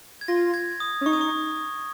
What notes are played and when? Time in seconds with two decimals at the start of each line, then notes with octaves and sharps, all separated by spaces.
0.21 G#6
0.28 F4 A#6
0.54 G#6
0.80 D#6
1.01 C#4
1.06 D#4 C#6
1.13 D#6
1.21 C#6